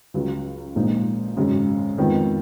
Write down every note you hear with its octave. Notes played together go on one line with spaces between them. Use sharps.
C#2 C#3 F#3
A#1 A#2 F3 G#3 D#4
G#1 F#2 C#3 G#3
F2 D#3 G#3 B3 F4